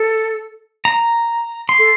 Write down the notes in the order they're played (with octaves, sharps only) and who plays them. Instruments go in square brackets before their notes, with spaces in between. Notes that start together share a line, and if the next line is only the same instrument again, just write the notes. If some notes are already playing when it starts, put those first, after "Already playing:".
Already playing: [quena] A4
[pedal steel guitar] A#5
C6
[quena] A4